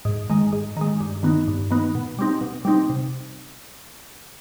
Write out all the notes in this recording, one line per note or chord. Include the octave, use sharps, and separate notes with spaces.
G#2
D#3 G#3
G#2
D#3 G#3
G2
D#3 B3 D#4
G2
D#3 B3 D#4
B2
G3 C4 D#4
B2
G3 C4 D#4
C3